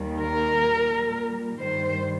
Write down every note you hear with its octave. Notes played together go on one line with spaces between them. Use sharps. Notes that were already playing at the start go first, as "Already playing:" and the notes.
Already playing: D#2 D#3 G3
A#4
A#2 G3
G2 D#3 G3 C5